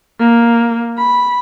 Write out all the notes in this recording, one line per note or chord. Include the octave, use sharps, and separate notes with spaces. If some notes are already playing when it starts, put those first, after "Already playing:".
A#3
B5